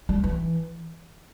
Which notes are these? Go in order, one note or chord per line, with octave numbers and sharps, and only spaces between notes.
G3
E3